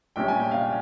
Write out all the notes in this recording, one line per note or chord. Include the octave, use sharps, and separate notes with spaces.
A#1 A#2 G3 C#4 G5
G#5
G5
F5